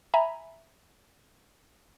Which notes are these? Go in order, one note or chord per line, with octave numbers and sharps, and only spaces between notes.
E5 G#5 A#5 B5